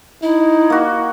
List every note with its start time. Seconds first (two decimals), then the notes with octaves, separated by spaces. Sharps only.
0.23 D#4 E4
0.70 A#3 F#4